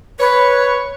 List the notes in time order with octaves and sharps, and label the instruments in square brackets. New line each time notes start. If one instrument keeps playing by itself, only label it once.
[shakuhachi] B4 [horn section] C#5